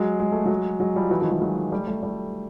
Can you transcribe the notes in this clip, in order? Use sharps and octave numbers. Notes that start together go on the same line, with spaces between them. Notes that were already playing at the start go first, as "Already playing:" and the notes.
Already playing: F#3 G#3
G#3
A3
F#3 G#3
F#3 G#3
F3 G3
E3 F#3
D#3 F3
E3 F#3
F#3 G#3
G3 A3
G3 A3
G3 A3